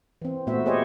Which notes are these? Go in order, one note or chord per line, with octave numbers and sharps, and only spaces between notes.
E3 C4
A#2 A3 B3 F#4 C5 E5
G4 G#4 C5 C#5 D#5